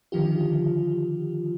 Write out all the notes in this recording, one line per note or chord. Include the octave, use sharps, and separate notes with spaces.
D3 D#3 F3 F4 G4